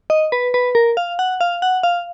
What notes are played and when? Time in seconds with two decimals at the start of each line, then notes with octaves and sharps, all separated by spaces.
0.10 D#5
0.32 B4
0.54 B4
0.75 A#4
0.97 F5
1.19 F#5
1.41 F5
1.62 F#5
1.83 F5